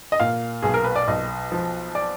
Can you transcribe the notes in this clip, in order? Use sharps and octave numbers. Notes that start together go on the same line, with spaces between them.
D#5
A#2 F5
B1 G#4
A#4
B4
D5
B1 D#5
F3
D5